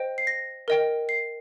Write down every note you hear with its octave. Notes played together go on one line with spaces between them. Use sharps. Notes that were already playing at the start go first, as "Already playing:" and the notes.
Already playing: C5 D#5 G5
C7
A#6
A#4 D#5 G5
C7